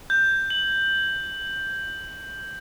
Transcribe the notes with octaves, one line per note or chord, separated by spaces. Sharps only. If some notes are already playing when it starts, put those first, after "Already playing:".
G6
F#7